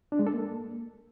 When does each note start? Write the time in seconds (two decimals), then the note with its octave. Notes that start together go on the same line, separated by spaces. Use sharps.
0.12 D4
0.19 G#3
0.27 A4
0.34 A#3